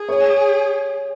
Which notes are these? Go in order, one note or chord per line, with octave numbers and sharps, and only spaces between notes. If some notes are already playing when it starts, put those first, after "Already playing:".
Already playing: G#4
C#5